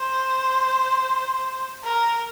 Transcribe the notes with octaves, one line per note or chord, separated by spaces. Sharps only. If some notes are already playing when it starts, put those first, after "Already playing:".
Already playing: C5
A#4